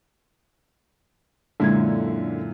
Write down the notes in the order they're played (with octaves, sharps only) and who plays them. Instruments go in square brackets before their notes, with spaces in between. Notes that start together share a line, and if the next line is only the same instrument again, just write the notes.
[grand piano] F#2 A#2 E4 [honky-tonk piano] D3 [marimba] G#3 A#3 G#6